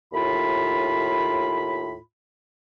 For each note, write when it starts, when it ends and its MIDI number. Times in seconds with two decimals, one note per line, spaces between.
0.13 1.97 39
0.13 1.97 45
0.13 1.97 65
0.13 1.97 83